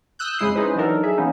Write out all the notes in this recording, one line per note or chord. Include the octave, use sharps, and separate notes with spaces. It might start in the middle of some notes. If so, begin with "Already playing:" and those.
D#6 E6 F#6 G6
F2 C#3 G#3 E4 D#6 C7
C#4 D#4 E4 G#4 B4 C5
E3 F#3 D4 D#4 A4 A#4
G#4 E5
E3 A#3 B3 C#4 D#4